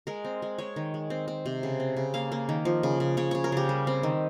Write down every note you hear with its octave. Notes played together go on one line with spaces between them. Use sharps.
G#3 A#4
C4
G#3
G#3 C#5
D#3
G#3
C4
C4
C3
C#3
C4
C#3
A#3 F5
A#3
D#3
F3
C#3
C#3
C#3 C#5
C#3 C#5
A#4
C#3 G4
G3
C4
D#3